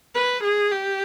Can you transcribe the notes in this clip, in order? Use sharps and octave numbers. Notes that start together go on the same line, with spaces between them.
B4
G#4
G4